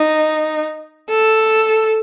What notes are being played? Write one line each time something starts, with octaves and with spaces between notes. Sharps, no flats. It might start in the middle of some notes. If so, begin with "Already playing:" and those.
Already playing: D#4
A4